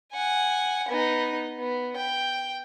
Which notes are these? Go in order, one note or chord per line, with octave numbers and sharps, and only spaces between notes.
F#5 G#5
B3 D#4
B3
G5